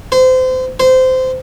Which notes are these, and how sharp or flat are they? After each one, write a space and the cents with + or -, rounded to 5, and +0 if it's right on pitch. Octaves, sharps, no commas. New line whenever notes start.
C5 -30
C5 -20